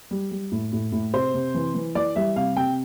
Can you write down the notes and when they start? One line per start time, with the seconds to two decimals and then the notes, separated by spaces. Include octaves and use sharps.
0.11 G3
0.31 G3
0.52 A2
0.73 A2
0.92 A2
1.14 C3 C5
1.34 C3
1.54 E3
1.75 E3
1.95 E3 D5
2.16 G3 E5
2.36 C3 F5
2.56 C3 G5